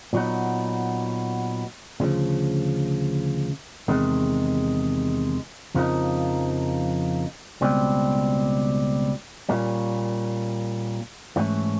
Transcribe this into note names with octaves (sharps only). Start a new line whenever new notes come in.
A#2 F#3 B3 D#4
D2 C#3 F3
E2 C3 D#3 G#3
F2 C#3 F3 A#3 D#4
C#2 B2 G3 C4
A#2 G3 A#3 C#4
G#2 E3 A3 C#4